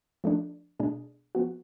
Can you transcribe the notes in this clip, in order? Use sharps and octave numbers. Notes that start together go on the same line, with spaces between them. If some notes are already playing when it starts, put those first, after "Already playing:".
F3 A3 D4
B2 A3 D4 G#4
F3 B3 F#4